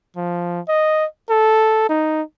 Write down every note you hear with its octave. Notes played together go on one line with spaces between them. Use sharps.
F3
D#5
A4
D#4